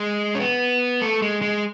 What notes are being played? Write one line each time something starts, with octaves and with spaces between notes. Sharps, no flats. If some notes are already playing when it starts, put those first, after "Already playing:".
Already playing: G#3
C#4
B3
A3
G#3
G#3